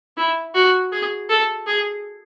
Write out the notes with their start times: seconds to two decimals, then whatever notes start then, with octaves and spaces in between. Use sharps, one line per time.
0.17 E4
0.54 F#4
0.92 G#4
1.30 A4
1.67 G#4